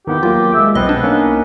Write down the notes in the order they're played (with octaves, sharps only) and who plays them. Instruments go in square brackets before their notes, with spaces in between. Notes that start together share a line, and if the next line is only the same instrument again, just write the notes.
[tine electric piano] D#3 B3 E4 [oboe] G4
[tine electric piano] F#3 A#3 [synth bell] F4
[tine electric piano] G#3 G#4 [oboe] E5
[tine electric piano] B1 C4 [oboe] B3 [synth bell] D#5
[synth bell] D4
[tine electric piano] A#3 C#4 D#4